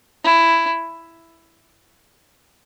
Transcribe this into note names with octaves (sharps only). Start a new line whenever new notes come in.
E4